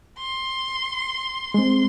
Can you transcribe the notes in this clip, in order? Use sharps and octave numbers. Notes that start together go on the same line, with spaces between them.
C6
G#3 C4 C6